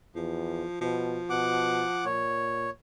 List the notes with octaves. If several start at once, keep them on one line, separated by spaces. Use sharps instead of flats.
E2 F3
B2 F3
B2 F#5 D6
A#2 C#5